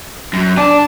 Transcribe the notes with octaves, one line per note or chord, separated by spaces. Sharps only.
F#2
D4 G#5 A5